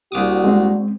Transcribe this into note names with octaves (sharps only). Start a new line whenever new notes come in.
C2 A#3 D4 F#4 D6 D#6
G#3 C4